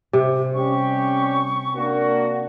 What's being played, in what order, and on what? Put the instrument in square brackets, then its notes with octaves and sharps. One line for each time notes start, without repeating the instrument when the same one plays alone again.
[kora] C3
[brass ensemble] G3 C#4 G4 [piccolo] C#6
[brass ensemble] A#3 D4 F#4